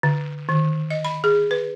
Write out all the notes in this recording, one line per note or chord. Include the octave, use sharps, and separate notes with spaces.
D3
D#3
D#5
B5
G#4
B4